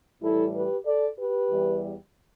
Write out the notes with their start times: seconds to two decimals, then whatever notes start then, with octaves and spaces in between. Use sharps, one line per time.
0.22 A2 E3 G3 E4 A4
0.54 G4 B4
0.85 A4 D5
1.18 G4 B4
1.50 E2 E3 G3